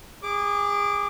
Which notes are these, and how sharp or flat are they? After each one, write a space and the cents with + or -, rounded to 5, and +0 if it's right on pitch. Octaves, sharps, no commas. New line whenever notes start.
G#4 -25 D6 +0